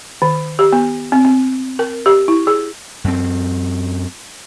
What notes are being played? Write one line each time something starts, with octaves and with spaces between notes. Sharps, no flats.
D#3
G4
B3
C4
C4
A#4
G4
E4
G#4
F#2 C4